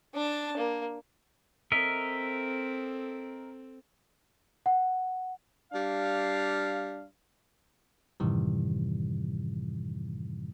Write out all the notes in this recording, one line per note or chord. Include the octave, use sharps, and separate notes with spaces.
D4 A5
A#3
C4 A4 A#4 D#5 E5
F#5
G3 D4 F5
F#2 A2 C3 D#3 E3 G3